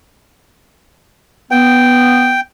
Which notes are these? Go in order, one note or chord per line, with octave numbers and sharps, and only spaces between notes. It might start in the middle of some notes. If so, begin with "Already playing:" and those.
B3 G5